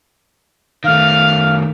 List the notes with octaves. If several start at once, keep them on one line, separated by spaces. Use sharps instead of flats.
D#3 A3 F5